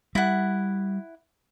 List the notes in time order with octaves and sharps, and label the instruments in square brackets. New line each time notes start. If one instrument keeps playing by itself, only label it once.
[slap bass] G3 [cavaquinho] E4 F#5